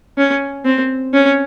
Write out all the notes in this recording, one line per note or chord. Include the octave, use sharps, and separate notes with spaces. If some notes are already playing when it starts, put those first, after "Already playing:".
C#4
C4
C#4